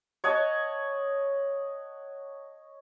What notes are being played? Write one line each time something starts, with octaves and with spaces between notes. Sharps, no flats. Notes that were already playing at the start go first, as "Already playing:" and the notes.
C#5 D#5 F#5 A5